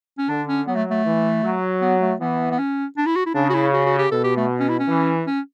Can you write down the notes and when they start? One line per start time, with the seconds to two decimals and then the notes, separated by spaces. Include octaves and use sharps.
0.18 C#4
0.29 D3 D4
0.48 C#4
0.67 F#3 B3
0.75 A3
0.91 A3
1.05 E3
1.43 F#3
1.81 B3
2.01 A3
2.20 E3 B3
2.51 B3
2.59 C#4
2.97 D4
3.06 E4
3.16 F#4
3.26 E4
3.35 C#3 D4
3.50 F#4
3.54 E4
3.73 F#4
3.86 F#4
3.99 G4
4.11 B2 A4
4.24 G4
4.37 A3
4.60 C#4
4.69 E4
4.79 C#4
4.88 E3
5.27 C#4